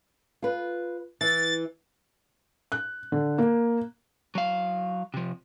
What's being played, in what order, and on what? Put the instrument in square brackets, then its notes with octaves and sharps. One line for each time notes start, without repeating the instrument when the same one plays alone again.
[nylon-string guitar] F4 B4
[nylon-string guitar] E3 [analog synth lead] A6
[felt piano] F#6
D3
A#3
[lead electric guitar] F#3 F5
C3 F3